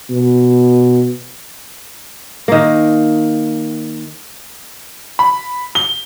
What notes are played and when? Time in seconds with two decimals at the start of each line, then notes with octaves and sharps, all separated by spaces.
0.11 B2
2.48 D#3 A#3
5.19 B5
5.75 G7